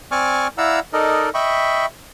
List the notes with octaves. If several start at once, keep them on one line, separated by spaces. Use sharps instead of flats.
C4 D5 G#5 C#6 D6 F6
E4 D5 F5 F#5 A#5 E6
D#4 A4 A#4 D5 D#5
D#5 E5 G5 B5 C#6